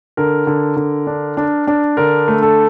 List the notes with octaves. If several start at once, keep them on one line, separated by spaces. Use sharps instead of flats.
D3 A#4
D3
D3
D4
D4
D4
D3 A#4
A3
A4